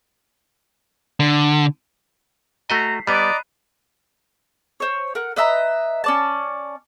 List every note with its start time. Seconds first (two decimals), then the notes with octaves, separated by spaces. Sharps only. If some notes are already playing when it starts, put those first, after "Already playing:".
1.20 D3
2.70 A3 F#4 D#5 A#5 B6 C7
3.07 G3 B3 D5 D#5 A#5 B5 F#6 D#7
4.80 C5 C#5
5.15 A#4 F#5
5.36 B4 D#5 E5 A#5
6.04 C#4 D5 A5